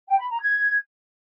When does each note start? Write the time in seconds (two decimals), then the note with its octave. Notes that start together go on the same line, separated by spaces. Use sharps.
0.08 G5
0.19 B5
0.30 A#5
0.41 G#6